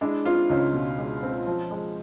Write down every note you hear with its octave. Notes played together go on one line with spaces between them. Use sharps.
G#3 D4 E4
C4 D#4 F4
C#2 C#4 D#4
B2
G#3
C4
F3
G#3